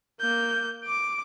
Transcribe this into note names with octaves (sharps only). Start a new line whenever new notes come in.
A#3 G6
D6 D7